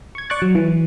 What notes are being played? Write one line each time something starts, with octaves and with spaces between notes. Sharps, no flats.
C#6 G#6
D5 C#6 D6 F#6 A6
F#3
E3